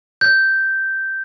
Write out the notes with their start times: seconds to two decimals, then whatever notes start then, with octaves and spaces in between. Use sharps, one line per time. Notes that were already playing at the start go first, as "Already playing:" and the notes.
0.21 G6